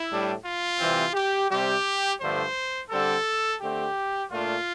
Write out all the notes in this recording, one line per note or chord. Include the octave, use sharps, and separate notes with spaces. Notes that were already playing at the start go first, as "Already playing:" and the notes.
Already playing: E4
A2 G3 D4
F4
C3 E3 G3 C4
G4
C3 G3 C4 G4
G2 D3 F3 A3 C5
D3 G3 C4 A4
D3 A3 C4 G4
A#2 A3 D4 F4